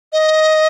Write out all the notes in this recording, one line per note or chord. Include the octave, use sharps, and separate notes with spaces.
D#5